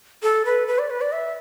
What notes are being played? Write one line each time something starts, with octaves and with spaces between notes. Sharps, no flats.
A4
B4
B4
D5
B4
D5
E5